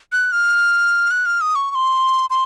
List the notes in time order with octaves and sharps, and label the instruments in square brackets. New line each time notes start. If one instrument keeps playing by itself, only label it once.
[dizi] F#6
F6
F#6
F6
D#6
C#6
C#6
C6
C6